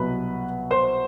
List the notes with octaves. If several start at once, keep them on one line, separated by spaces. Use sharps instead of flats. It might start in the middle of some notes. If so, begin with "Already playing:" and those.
Already playing: C2 B2 F#3 B3 B4 B5
C5 C6